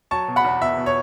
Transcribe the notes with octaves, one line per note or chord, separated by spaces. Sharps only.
F#3 A5 C#6
B2
F#5 B5
E2
B2 E5
B2
C#5